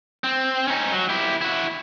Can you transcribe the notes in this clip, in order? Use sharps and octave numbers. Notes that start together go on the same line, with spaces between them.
C4
C#4 D#4
F#3
E4 G4
E4 F#4